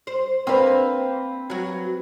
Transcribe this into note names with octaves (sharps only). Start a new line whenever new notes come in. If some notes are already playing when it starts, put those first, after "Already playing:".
C5
A#3 C4 D4 B4
F#3 F#4